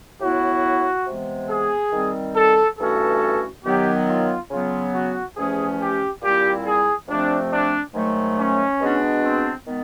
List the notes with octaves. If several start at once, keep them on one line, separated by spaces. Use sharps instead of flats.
A2 F#3 B3 E4 F#4
C3 E3 G#3 B3
G#4
D#3 G3 C4
A4
G2 E3 A3 C#4 F#4 A4
D#3 F#3 B3 G4
F4
C#3 F#3 B3 F4
F#4
E2 C3 F3 A3 C#4 G#4
G4
A#2 G3 C4 E4 G4
G#4
F2 C3 F3 A3 C4 D4
D4
G#2 D#3 F#3 A3
C#4
B2 G#3 B3 D4 F#4
C4
D#3 G#3 B3